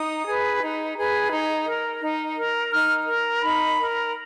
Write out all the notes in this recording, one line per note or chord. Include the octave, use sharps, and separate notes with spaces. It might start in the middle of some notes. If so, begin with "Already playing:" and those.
Already playing: D#4 D#6
G#4 B4
D#4
G#4 B4
D#4
A#4
D#4
A#4
D#4 F6
A#4
D#4 B5
A#4